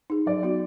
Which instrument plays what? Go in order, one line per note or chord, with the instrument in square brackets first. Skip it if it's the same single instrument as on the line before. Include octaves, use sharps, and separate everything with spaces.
[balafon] D#4 G#4
[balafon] F#3 [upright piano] D5
[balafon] B3 D#4 F#4